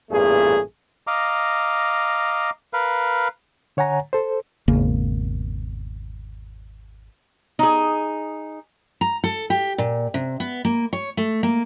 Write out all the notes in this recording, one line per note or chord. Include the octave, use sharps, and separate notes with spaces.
A1 E2 G2 A#2 A3 G#4
D#5 F5 A#5 D6
A#4 B4 F5
D3 C#5 F#5 G#5 A#5
A4 C5
G#1 E2 C#3 A#3
D#4 G#4
A#5
A4
G4
A#2
C3
B3
A#3
C#5
A3
A#3